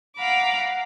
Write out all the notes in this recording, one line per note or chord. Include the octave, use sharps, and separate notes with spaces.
F5 F#5 A#5 B5 D6